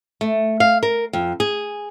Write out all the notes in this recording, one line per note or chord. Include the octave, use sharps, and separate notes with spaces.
A3
F5
A#4
F2
G#4